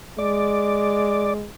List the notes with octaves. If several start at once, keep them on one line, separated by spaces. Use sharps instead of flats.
G#3 D5